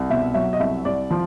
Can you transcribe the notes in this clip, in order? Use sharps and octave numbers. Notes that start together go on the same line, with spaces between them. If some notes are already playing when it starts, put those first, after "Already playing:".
Already playing: C2
B2 E5
F#3 E5
D#5
C2 E5
C2 D5
F3